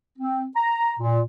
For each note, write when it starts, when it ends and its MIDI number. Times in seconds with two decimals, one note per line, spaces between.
0.18 0.44 60
0.55 0.92 82
0.98 1.21 46